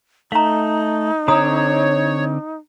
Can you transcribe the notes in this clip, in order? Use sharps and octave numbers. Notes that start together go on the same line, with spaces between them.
A3 D#4 F5 A#5
D3 C4 C#5 A#5 D#6